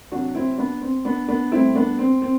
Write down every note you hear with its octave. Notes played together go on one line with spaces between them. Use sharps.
C3 F#3 D4 F#4
C4 E4
B3 D4
C4
B3 D4
B3 D4
A2 G3 C4 E4
B3 D4
C4
C4